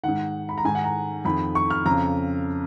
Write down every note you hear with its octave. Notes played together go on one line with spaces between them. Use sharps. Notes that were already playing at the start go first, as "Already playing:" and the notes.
G#2 D#3 F#5
B5
A#5
G#2 D#3 G#5
F#5
A#5
F2 D#3 B5
C#6
F6
F2 C#3 A#5